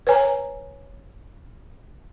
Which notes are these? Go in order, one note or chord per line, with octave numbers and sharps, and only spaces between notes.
B4 C#5 G#5 A#5